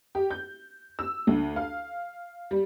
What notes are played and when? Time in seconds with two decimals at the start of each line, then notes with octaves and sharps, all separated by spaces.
0.15 G4
0.31 G6
0.99 E6
1.27 D2
1.56 F5
2.51 G3